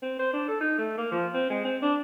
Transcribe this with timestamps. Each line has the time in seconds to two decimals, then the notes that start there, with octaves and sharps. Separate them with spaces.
0.02 C4
0.19 C5
0.33 D4
0.48 A4
0.61 D#4
0.79 A3
0.98 A#3
1.12 F3
1.34 C4
1.50 G#3
1.65 C4
1.82 D4